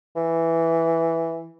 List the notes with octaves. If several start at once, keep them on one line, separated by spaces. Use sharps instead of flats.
E3